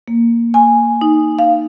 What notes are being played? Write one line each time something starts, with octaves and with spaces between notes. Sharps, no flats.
A#3
G#5
D#4
F5